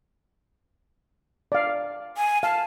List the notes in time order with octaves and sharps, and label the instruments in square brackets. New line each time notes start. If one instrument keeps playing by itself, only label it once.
[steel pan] D5 F5
[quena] G#5
[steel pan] F5 [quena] A5